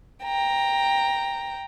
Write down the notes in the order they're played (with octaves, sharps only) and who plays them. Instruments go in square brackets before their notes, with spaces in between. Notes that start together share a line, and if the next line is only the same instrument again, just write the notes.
[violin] G5 A#5